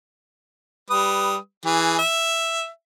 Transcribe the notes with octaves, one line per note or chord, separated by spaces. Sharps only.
G3 B4 D#6
E3 G#4
E5